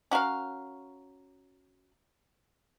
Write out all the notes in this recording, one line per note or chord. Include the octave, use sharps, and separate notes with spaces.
C#4 F#4 A#4 F5